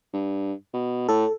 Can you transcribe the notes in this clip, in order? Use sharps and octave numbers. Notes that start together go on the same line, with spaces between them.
G2
B2
A2 A4